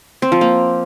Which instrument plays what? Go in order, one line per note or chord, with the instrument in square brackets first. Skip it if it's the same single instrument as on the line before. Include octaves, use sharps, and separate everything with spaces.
[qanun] C4
F3
A#3